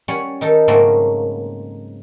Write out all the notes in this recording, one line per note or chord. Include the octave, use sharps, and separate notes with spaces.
G3 C#4 C#5 F#5
D#3 D#4 A4
G#2 C#3 F#3 A3 A#3 C4